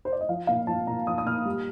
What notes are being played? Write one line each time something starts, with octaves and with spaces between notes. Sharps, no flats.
C5
D5
D#5
F3 F5
A#2 F5
F3 A5
A#2 A#5
F3 D#6
D#6
A#2 F6
G3